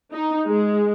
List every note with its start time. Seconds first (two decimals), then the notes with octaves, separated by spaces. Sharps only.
0.13 D#4
0.48 G#3